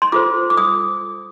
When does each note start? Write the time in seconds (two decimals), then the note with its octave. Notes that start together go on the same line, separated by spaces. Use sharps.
0.02 C6
0.12 F4 A4 C5 D6
0.50 D6
0.57 D#6